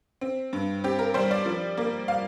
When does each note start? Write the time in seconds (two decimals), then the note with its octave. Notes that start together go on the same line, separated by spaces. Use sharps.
0.21 C4
0.53 G2
0.84 C4 G4
0.99 A#4
1.14 G3 C5
1.31 D5
1.46 F3
1.77 A#3
2.08 F5